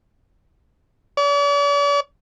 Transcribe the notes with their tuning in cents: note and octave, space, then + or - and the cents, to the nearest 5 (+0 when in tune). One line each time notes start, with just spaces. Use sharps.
D5 -45